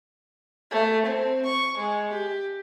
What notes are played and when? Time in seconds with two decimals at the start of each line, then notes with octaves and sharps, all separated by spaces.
0.71 A3
1.05 C4
1.45 C#6
1.77 G#3
2.12 G4